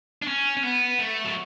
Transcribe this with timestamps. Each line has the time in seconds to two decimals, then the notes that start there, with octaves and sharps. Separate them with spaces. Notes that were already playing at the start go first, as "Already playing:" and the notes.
0.22 D4
0.27 C#4
0.57 C#4
0.64 B3
0.99 A3
1.24 F#3